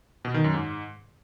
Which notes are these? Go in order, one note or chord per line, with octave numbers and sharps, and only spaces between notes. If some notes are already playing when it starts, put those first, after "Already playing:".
B2
D#3
F#2
G#2